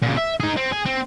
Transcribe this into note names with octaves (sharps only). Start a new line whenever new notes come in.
A#2 C#3
E5
D#4 G#4
C4
G#4
C4